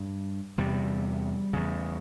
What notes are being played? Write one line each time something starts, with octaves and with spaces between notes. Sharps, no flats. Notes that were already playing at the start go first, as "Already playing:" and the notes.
Already playing: G2
E2 C3 G3
E2 C#3